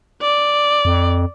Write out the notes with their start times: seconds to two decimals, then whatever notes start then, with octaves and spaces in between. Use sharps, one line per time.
0.22 D5
0.85 F2